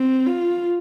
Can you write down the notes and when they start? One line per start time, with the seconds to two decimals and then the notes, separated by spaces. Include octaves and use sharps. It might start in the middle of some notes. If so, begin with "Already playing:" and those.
Already playing: C4
0.26 F4